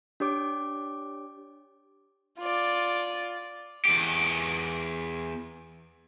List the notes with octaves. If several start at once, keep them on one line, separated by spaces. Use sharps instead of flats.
D4 G4 C#5 D6
F4 D5
E2 G4